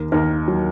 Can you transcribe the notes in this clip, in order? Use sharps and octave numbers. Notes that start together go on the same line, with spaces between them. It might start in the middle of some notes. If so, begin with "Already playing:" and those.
Already playing: D#2 A#4
D#2 A#4
F#3